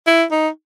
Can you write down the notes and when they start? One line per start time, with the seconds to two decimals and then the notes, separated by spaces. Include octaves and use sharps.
0.07 E4
0.31 D#4